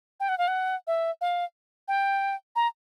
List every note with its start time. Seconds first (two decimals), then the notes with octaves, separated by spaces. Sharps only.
0.20 G5
0.29 F#5
0.38 F5
0.48 F#5
0.87 E5
1.21 F5
1.88 G5
2.56 A#5